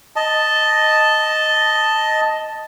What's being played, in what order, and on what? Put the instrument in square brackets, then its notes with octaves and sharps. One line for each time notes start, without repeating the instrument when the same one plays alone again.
[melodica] D#5 A5